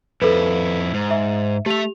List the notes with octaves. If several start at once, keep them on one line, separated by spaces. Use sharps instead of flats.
F2 E4 A4 B4
G#2
E5
A3 G4 E5 F7